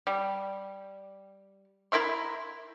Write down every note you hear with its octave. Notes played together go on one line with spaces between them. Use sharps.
G3
E4 A#4 E5 C6